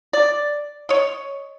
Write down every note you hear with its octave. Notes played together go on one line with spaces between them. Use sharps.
D5
C#5 D#5